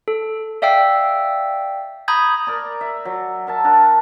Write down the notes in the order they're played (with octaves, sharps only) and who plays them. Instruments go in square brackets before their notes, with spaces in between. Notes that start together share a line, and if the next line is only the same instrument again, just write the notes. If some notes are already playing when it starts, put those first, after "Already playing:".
[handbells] A4
D5 E5 F5 G5 E6
A#5 B5 D#6 G6 G#6
[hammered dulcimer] A#4 D5 A#5
E5
F#3
A#4 E5 A5
D4 A#4 F#5 A5